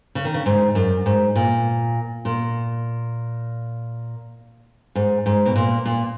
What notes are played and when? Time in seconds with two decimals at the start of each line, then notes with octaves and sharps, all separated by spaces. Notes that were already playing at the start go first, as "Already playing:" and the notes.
0.15 C#3
0.25 D#3
0.34 C#3
0.46 G#2
0.75 F#2
1.06 G#2
1.36 A#2
2.25 A#2
4.95 G#2
5.26 G#2
5.45 B2
5.56 A#2
5.86 A#2